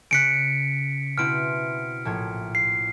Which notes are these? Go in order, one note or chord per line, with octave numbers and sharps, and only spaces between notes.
C#3 F#6 B6 C#7 D7
B2 C4 E4 F6 D7
A#1 A2 C#5
C7